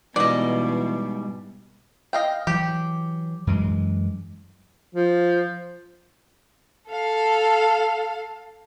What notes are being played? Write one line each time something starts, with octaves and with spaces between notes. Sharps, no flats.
G#2 B2 E3 G3 D5 D#5
D#5 F5 G5
E3 F#3 G4
F#2 E3 G#3
F3
A4 F5